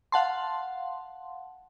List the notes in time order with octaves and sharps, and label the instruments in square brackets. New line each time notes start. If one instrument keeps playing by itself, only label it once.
[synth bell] F5 F#5 A5 C6